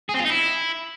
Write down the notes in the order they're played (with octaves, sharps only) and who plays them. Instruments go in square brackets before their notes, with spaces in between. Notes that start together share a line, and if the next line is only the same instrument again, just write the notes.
[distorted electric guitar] G#4
C4
F4
D#4
E4